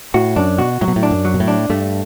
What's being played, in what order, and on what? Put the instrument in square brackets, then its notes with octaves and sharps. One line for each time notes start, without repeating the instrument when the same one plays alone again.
[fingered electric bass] A2 [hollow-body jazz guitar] F#4
[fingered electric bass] F#2 [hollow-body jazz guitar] D4
[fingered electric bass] B2 [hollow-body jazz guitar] F#4
[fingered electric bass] A2 [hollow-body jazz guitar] F#3
[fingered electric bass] B2
A2
[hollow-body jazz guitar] D4
[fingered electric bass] F#2
[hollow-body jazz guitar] F#3
[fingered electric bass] B2
A2
[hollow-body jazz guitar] D4
[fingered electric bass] G2 [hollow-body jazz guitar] A3